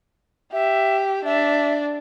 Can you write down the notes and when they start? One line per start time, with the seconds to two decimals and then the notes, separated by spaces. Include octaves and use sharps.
0.53 G4 E5
1.25 D4 E5